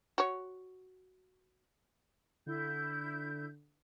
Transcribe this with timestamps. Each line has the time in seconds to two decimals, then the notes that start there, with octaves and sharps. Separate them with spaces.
0.18 F#4 C#5
2.46 D3 E4 G6